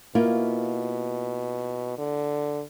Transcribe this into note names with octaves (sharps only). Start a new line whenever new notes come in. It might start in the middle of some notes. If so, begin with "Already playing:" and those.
B2 A#3 E4 F4
D3